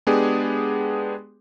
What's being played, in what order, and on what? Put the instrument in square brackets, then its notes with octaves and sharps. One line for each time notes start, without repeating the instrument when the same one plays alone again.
[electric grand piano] G#3 B3 D4 G4 G#4